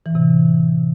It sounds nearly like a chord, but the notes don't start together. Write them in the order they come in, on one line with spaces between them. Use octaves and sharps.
E3 A2 C3